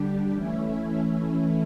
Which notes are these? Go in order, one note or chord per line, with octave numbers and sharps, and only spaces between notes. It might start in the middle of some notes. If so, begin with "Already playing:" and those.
Already playing: D3 G3 D4 G4
E3 A3 C#4 E4